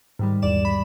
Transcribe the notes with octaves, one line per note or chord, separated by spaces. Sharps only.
G#2 D#3 G3
A#1 E2 D5 E7
B5